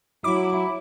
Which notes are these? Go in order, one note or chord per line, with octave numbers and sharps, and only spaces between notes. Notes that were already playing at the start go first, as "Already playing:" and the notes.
F#3 E4 D6